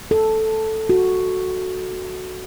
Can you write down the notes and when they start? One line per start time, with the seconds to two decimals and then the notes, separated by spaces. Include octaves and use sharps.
0.11 A4
0.90 F#4